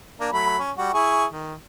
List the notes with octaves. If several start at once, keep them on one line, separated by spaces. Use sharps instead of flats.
A#3 D4
F#3 A3 B5
C#4
G3 F#4
E4 G#4 C#6
D#3